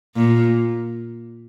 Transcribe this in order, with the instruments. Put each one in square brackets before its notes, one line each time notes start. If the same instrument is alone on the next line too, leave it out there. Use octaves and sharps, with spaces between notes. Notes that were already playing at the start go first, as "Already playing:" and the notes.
[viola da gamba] A#2